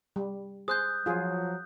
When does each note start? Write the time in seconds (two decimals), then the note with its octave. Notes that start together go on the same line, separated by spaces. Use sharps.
0.16 G3
0.68 G#4 C5 D#6 F#6 G6
1.06 F3 F#3 F4 G#4